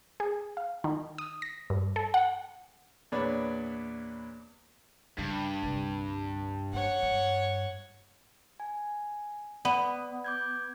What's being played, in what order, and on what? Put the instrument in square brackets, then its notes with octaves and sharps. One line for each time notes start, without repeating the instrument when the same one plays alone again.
[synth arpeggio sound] G#4
F5
D#3
D#6
A#6
G2
A4
F#5
[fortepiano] E2 A#2 D4 B4 C#5 D5
[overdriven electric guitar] G2 [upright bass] C#3
[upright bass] C2 D3
[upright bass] C#4 [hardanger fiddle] C#5 F#5
[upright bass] G2
[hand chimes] G#5
[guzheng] B3 [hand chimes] D5
[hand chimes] D6 G6 G#6